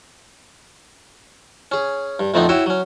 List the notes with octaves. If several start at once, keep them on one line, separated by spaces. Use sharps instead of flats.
C#4 G#4
G2
F2 A#2 A3 B3 C4 D#4
E4 F#4 C#5 E5 G5
F#3 C#4